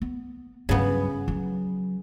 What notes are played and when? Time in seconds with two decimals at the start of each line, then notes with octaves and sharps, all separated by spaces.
0.02 B3
0.69 G2 C#3 F#3 B3
1.28 F#3